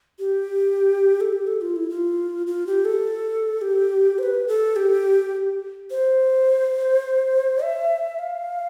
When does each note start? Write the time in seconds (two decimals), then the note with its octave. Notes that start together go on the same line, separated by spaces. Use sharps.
0.19 G4
1.21 A4
1.33 G4
1.47 A4
1.61 F4
1.76 E4
1.90 F4
2.47 F4
2.67 G4
2.85 A4
3.61 G4
4.19 C5
4.23 B4
4.48 A4
4.76 G4
5.91 C5
7.63 E5
8.19 F5